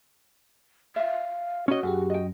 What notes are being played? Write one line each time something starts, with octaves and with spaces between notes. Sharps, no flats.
E5 F5
C#4 F#4 D#5
F#2 G4 G#4 F#5
D#5 G5